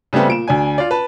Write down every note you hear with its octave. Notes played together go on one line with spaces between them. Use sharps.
C#3 G3 A3 B3 C4
A#2 D7 E7
D2 D4 G#5
F4 D5
B4 A5